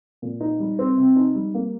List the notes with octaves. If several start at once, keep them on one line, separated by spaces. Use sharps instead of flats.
A#2
D#4
G3
C4
C3
D#4
G3
A#3